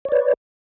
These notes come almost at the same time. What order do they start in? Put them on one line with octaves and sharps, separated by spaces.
C#5 D5 B4